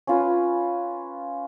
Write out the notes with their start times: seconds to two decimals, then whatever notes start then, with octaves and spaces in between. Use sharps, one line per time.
0.07 C#4 F4 B4